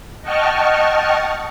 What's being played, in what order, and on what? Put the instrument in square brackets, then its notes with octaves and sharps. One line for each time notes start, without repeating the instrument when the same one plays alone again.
[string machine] D#5 F#5 G5 A5 C#6 F6